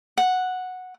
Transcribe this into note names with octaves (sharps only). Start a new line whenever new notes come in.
F#5